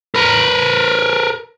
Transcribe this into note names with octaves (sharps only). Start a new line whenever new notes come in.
A#4 B4